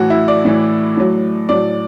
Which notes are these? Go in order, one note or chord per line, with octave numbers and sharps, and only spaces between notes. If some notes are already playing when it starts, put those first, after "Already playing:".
Already playing: A2 E3 F#4
E4
D5
A2 E3
A2 F#3
A2 F#3 D5